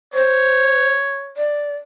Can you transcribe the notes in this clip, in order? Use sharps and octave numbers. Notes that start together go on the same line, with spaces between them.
C5 C#5
D5